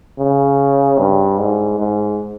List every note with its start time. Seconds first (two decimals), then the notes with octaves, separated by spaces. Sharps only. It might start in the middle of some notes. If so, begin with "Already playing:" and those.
0.19 C#3
0.99 G2
1.40 G#2
1.79 G#2